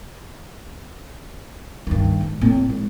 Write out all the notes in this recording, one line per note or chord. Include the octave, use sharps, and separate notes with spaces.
G2 D#3
G#2
A2 C4
G#3